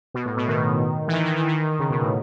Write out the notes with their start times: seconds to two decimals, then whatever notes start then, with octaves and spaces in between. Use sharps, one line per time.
0.14 B2
0.26 A2
0.37 B2
0.48 D#3
1.08 E3
1.13 D#3
1.24 E3
1.36 E3
1.47 D#3
1.79 C#3
1.90 B2
2.02 A2